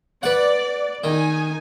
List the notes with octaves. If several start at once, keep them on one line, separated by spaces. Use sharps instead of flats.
B4 D5 F#5
D#3 D#4 G#5